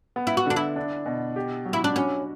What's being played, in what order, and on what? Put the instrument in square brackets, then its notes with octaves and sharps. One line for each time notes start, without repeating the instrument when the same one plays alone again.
[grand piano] B3
[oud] E4
F#4
[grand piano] D3 [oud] D4
[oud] E4
[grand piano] D4
B2
G4
F#3
[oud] E4
D4
[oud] C#4 [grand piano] F#4